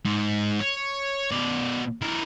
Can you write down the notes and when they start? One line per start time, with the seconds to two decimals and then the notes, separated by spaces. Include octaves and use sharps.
0.05 G#2
0.59 C#5
1.31 B2 D5
2.02 E3 A#4